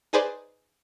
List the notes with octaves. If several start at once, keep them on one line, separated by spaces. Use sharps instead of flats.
D#4 G#4 B4 C5 D5